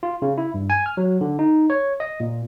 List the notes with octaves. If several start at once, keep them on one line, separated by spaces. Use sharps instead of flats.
F4
C#3
E4
G2
G#5
F6
F#3
D3
D#4
C#5
D#5
A#2